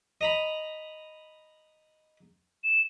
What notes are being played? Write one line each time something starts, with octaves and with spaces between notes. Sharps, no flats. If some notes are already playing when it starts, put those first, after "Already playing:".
D#5 A#5 B5
E7